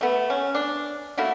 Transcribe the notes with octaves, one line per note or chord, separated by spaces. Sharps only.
A3 B3
C#4
D4
A3 A#3 E4 F#4